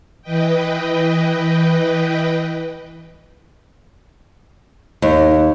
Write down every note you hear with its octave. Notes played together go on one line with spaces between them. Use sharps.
E3 B4 D#5 G5
D#2